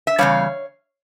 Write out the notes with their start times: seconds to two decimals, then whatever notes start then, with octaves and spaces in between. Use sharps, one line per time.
0.07 E5
0.18 E2 C#3 G3 C#5 F5